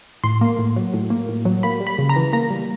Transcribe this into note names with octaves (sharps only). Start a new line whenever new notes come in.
A2 C6
A#3
A2
F#3
A2
A#3
A2
F#3
A#3 B5
G3
B5
C#3
A#5
E3
A#3 A#5
G3